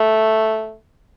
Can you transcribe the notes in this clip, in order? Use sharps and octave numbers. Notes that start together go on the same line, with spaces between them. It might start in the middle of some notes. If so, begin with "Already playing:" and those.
Already playing: A3